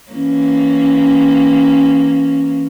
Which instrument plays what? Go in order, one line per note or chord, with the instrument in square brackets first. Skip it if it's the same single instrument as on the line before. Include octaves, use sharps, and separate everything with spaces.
[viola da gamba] E3 A#3 C#4